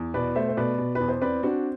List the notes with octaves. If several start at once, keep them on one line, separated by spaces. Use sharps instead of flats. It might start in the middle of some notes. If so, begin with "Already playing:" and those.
Already playing: E2
B2 B4 D5
A3 C5 E5
C5
B2 B4 D5
B2
E2 B4
C5
C4 B4 D5
C4 D4 F#4